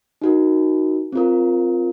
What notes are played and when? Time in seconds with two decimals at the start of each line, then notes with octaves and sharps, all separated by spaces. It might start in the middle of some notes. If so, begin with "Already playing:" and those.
0.22 D#4 F#4 A#4
1.12 C4 F4 A#4